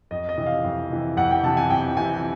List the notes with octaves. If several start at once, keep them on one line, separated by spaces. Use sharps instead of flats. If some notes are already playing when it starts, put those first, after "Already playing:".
F2 D#5
D#5
C3 E3
F5
F2
C3 E3
F2 F#5
G5
C3 E3 A5
G#5
F2 G5
C3 E3 G#5